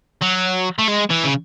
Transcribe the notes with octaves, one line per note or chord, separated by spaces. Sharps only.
F#3
A3
G#3
E3
C#3